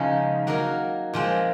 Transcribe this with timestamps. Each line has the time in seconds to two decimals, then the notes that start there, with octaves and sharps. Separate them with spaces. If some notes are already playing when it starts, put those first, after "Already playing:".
Already playing: C#3 F3 G#3 D#4
0.47 F#3 A#3 D#4 A#4
1.13 A#2 F3 G#3 C4